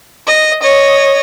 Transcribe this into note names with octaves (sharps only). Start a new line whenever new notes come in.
D#5
C#5 D#5